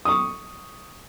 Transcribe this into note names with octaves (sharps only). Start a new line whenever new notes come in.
C#6 D#6